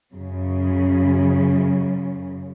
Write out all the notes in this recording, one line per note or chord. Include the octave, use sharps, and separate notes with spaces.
F#2 C#3